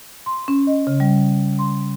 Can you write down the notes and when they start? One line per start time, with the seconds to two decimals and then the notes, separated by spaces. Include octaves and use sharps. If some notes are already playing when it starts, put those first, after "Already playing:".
0.26 C6
0.48 C#4
0.67 D#5
0.87 C#3
1.00 G3
1.59 C6